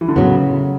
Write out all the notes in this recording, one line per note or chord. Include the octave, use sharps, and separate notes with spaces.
E3
D3
A2 C#3 F#3 B3